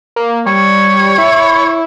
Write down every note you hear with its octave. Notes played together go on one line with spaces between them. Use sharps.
A#3
G3 C#5
E4